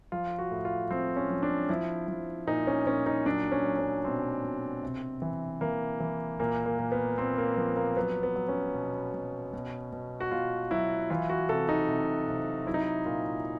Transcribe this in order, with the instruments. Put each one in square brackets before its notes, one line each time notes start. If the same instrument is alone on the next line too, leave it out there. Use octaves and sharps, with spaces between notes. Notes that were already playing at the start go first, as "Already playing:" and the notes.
[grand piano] F3 F4
F#4
A2
F4
F3 C4
C#4
F3
D4
F3 E4
F3
A#2 D#4
C#4
A#2 C#4
D#4
F#3 D4
C#4
F#3
C#4
B2 C4
B2
C3
E3
E3 A#3
E3
A#2 A#3
A#3
A#2
B3
A#2 C4
A#3
F3 B3
A#3
F#3 B3
B3
F#3
C#4
B2
B2
B2
B2
F#4
B2 F4
F#3 E4
E3 F4
F#4
C3 A4
D#4
C3
C3
F#3 E4
D#4
E4
A#2 F4